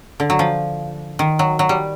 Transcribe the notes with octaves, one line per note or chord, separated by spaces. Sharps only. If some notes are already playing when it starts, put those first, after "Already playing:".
D3
F#3
F3
D#3
F#3
F#3
G3